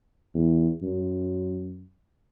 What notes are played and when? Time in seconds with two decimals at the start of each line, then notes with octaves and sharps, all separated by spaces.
0.35 E2
0.82 F#2